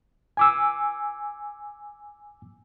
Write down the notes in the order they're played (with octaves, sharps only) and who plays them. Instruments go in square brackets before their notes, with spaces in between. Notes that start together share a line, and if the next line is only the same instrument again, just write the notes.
[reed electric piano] G#5 D6 E6